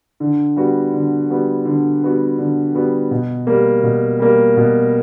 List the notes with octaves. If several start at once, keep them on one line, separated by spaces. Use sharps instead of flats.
D3
G3 B3 F#4
D3
G3 B3 F#4
D3
G3 B3 F#4
D3
G3 B3 F#4
B2
G3 A#3
B2
G3 A#3
B2